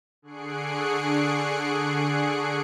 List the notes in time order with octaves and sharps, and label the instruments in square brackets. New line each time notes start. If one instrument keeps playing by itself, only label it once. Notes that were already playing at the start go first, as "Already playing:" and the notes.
[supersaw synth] D3 G#4 C#6 F#6 C7 D7